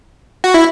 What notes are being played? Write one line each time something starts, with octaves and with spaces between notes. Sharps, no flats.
F#4
E4